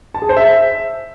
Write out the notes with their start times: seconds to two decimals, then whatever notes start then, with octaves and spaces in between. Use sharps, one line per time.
0.14 A5
0.22 G#4
0.29 C5
0.37 E5